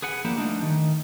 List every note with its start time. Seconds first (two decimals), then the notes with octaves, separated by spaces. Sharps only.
0.02 G#4 B4 F#5 G#5
0.25 F3 A#3 D4 E4 G4 B4
0.37 G3 A3 D4 D#4
0.63 D#3